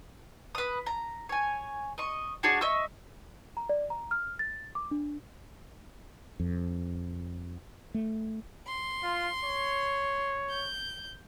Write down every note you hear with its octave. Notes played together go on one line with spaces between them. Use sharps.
B4 D#6
A#5
C#5 G#5
D#5 C#6
D4 F#4 G#4 C#5
D#5 E5 C#6 E6
A#5
D5
A#5
F6
A6
D6
D4
F2
A3
C6
F4
C#5
G6